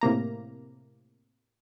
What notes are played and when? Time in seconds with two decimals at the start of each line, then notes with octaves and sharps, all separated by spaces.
0.01 A2 C3 A#3 A#5